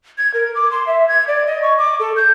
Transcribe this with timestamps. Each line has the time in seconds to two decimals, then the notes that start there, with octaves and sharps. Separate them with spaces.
0.18 G#6
0.34 A#4
0.55 D6
0.71 C6
0.87 E5
1.08 G#6
1.28 D5
1.47 D#5
1.62 C#6
1.78 D6
2.00 A4
2.16 G6